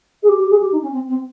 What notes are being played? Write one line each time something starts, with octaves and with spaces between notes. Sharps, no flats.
G#4
G4
G4
G#4
G4
D#4
C#4
C4
C4